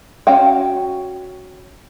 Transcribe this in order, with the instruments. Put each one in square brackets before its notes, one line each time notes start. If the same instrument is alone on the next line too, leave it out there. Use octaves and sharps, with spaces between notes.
[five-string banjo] C#4 F#4 F5 G5